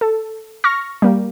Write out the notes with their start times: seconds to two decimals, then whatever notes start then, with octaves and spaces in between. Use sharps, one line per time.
0.01 A4
0.64 C#6 F6 A#6
1.02 G3 A#3